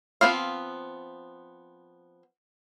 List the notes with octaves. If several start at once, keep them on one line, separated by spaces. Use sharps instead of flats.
F3 B3 C4 F5